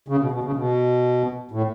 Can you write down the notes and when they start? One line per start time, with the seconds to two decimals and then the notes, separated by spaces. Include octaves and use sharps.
0.08 C#3
0.20 B2
0.32 B2
0.43 C#3
0.56 B2
1.51 A2